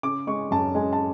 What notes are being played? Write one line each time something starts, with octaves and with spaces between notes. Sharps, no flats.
C#3 D6
G#3 C#6
F#2 A5
G#3 G#5
A5